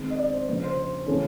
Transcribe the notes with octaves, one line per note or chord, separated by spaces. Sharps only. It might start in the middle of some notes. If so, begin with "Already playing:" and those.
Already playing: D#3 G#3 C4
D#5
D5
C5
C#3 F3 A#3 B4
C5
C5
C#3 E3 A3 C#4